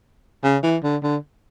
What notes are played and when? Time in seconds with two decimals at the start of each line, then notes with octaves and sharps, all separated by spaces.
0.44 C#3
0.63 E3
0.83 D3
1.03 D3